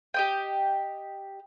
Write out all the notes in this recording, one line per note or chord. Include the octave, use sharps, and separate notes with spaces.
G4 D#5 G5